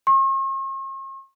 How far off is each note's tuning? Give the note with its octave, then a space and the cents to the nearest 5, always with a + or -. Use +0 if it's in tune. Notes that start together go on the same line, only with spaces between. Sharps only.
C#6 -45